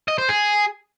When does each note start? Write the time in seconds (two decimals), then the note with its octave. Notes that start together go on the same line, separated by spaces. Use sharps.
0.08 D#5
0.18 C5
0.29 G#4